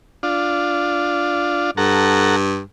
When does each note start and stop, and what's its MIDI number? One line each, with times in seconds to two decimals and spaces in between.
0.23 1.71 62
0.23 1.71 65
1.77 2.61 43
1.77 2.36 69
1.77 2.36 78
1.77 2.36 82